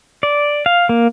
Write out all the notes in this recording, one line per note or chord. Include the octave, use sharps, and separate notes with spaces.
D5
F5
A#3